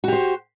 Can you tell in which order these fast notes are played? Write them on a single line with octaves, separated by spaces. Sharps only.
F#4 G4 C5